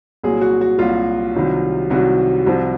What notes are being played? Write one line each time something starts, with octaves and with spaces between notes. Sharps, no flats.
C2 A#2 F#3 G#4
F#4
F#4
C2 A#2 F#3 F4
C2 C3 D#3 F#3
C2 C3 D#3 F#3 F#4
C2 C3 F3